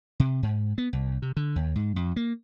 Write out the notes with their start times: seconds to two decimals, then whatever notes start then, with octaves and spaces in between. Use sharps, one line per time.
0.20 C3
0.43 G#2
0.78 B3
0.93 C2
1.22 C3
1.37 D3
1.56 D#2
1.76 G#2
1.96 F2
2.16 A#3